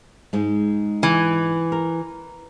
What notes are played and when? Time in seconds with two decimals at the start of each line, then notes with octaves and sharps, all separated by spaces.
0.33 G#2 G#3
1.03 E3
1.72 A#4